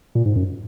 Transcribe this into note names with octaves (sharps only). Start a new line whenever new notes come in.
A#2
G#2
F#2